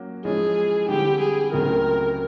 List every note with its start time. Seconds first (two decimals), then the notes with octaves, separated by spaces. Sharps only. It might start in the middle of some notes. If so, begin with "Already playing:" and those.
Already playing: F#3 A#3 C#4 F#4
0.25 F3 G#3 C#4 E4 G#4
0.89 D3 G3 C4 E4 G4
1.20 G#4
1.53 C#2 C#3 F#3 A3 C4 A#4